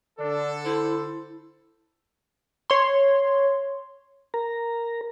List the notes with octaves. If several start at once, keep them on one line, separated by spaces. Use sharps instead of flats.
D3 D4 A4
E4 C5
C#5 C6
A#4 A#5